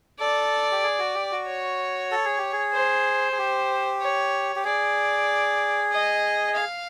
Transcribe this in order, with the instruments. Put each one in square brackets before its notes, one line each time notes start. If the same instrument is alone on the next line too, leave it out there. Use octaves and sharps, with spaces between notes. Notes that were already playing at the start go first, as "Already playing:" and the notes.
[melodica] A4 [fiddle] D5
[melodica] G4
G#4
F#4
G4
F#4
[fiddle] C#5
[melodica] A4
G#4
G4
G#4
[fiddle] C5
[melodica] G#4
G4
[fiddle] C#5
[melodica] G4
[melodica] G#4 [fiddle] D5
[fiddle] D#5
F5